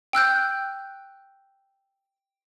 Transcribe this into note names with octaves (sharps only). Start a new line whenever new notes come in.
G5 E6 F#6 G6